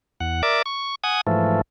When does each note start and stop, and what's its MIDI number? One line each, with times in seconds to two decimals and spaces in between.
0.20 0.42 40
0.20 0.42 78
0.43 0.62 70
0.43 0.62 74
0.43 0.62 76
0.43 0.62 86
0.66 0.95 85
1.04 1.21 78
1.04 1.21 80
1.04 1.21 87
1.27 1.61 44
1.27 1.61 52
1.27 1.61 53
1.27 1.61 57